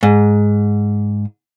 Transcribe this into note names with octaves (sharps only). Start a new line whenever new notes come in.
G#2